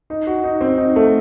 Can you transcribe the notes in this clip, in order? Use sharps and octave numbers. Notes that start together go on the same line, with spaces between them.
D#4
F#4
D#4
C4
D#4
A3